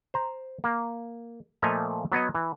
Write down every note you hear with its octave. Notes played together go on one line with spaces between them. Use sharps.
C5 A#5
A#3
A#2 F3 A3 D#5 G#5 A#5
F#3 B3 C#5 D#5
E3